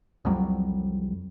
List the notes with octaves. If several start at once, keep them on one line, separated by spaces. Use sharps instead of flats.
C2 F2 F#3 G3